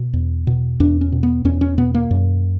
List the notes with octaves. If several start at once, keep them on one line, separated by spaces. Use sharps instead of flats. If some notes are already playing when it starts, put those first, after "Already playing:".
Already playing: B2
E2
B2
E2 D4
C#4
B2
B3
E2 C#4
C#4
B2 B3
A#3
F#2